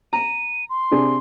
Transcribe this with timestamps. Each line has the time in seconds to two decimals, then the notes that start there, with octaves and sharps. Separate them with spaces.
0.13 A#5 D#7
0.70 C6
0.91 C3 D4 G#4